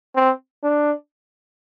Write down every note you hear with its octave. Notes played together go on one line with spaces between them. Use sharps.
C4
D4